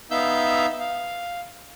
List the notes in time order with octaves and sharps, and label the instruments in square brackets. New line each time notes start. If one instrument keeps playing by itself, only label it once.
[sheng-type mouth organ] B3 D#4 E5 F5 E6 G6
F5